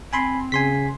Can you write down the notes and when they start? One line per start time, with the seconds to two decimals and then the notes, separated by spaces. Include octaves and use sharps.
0.13 C4 G#5 B5 C6
0.52 C#3 G#5 C6 B6